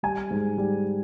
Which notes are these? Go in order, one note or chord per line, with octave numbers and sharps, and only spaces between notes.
G3 G#5
G#2
G3